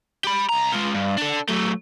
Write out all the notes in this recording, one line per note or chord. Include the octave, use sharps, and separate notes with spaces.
G4 B5
C2 A#5
G#3 F4
G2
D4 A4
F#3 A3